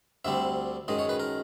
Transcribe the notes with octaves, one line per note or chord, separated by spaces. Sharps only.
D2 D3 G3 C4 E5
F#2 D#3 G#3 D#5
C#5
B4
A#4